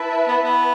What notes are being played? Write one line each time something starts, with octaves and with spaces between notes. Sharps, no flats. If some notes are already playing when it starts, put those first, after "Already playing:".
Already playing: E4 B4 E5 A5
B3
B3